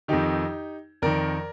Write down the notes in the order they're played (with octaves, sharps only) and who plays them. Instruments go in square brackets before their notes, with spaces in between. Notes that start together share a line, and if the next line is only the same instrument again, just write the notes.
[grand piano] F2 D#3 D#4 G4
F2 D#3 A#4 D5